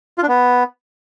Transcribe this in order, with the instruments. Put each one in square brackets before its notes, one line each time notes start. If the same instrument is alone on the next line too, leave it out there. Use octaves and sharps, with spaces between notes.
[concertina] F4
D4
B3